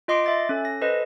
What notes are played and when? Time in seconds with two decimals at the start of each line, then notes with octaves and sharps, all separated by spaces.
0.08 F4 D#5 C6 D6 C7 D7
0.26 E5 A6
0.49 C#4 A4
0.65 A#6
0.81 A4 B4 C5 D#5